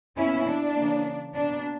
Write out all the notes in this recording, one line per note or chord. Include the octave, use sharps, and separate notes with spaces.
B2 A#3 C#4 E4
D4
C#3 E3 A#3
B2 A#3 D4